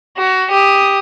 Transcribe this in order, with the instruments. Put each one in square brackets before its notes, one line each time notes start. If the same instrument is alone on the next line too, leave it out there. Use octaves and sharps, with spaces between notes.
[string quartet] F#4
G4 D#6